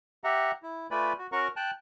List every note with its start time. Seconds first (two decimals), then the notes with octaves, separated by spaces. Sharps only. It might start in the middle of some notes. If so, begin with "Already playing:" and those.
0.24 G4 E5 F#5 A#5
0.63 E4
0.91 A3 F4 B4 D5 G#5 B5
1.19 F#4
1.32 C#4 F#4 A#4 F#5 A#5 C#6
1.56 G5 A5 F#6